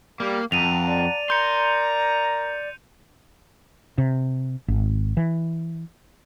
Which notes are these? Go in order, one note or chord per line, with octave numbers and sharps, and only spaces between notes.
G3 A#3
F2 F#5 A5 A#5 D#7 F7
D5
A#4 A#5 C6 G6 C#7
C3
G#1
E3